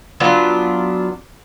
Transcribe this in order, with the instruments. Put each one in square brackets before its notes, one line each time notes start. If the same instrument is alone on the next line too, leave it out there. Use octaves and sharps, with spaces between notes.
[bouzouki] F#3 B3 D4 F4